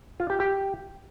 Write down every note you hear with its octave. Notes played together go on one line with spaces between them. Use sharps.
F4
G4
G4